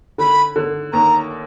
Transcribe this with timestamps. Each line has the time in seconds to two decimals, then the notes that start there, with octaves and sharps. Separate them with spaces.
0.18 D3 B5
0.56 D3
0.92 D#2 A#5